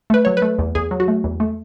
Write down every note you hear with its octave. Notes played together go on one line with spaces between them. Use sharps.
A3 B4
F#3 C#5
B4
A3
E2
E2 G#4
F#3
F#4
A3
E2
A3